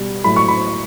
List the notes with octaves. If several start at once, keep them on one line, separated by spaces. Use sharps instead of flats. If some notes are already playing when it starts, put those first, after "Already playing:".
Already playing: B2 G3
A2 F#3 A3 B5
C#6
B5